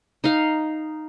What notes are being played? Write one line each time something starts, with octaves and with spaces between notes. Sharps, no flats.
D#4 F5